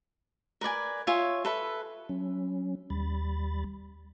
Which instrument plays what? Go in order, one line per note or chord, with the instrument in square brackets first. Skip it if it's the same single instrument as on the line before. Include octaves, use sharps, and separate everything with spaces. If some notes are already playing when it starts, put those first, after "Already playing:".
[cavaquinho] A#4 B4 D5 G#5
F4 C#5 E5 G#5
A4 B4 E5
[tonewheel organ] F#3 C#4
D#2 G3 B5 A6